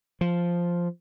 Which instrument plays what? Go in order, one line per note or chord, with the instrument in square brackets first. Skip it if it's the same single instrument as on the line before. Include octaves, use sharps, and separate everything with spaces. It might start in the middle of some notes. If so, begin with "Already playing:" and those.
[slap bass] F3